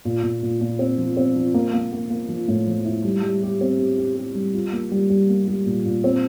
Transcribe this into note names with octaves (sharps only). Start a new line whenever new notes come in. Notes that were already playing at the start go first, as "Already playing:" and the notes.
A#2
A#2
A#2
A#2
C4
F3
C4
F3
A#3
A#3
A#3
A#3
F3
A2
F3
E4
G3
G3
G4
C4
G4
G4
G4
G3
F4
A#3
G3
G3
A#3
G3
A#2
A#2
C4